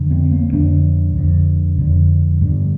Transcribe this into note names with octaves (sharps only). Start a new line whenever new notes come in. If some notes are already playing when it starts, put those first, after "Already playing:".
Already playing: F2 D3
C4
A#3
F2 D3 D4
F2 D3
F2 D3
G2 D3